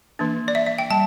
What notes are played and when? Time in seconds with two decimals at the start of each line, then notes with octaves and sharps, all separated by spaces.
0.19 E3 A#3 D4
0.48 D5
0.55 E5
0.66 E5
0.78 G5
0.90 G3 A5